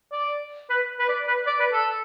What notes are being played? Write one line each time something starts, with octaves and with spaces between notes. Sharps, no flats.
D5
B4
B4
D5
B4
D5
B4
A4